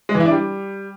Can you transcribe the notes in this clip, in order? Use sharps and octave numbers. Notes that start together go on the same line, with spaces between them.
G#3
E3
E4
D4
G3